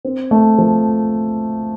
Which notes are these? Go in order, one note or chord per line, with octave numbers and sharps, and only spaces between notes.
C4
A3
F3